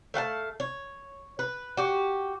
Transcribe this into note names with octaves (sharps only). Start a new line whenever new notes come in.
A3 F5 F#5 A5
C#5
B4
F#4 G4